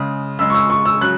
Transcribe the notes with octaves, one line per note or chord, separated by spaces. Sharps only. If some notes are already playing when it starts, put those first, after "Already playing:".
Already playing: C#3 G#3
C#3 G#3 E6
C#6
E6
C#6
E6
C#3 F#3 F#6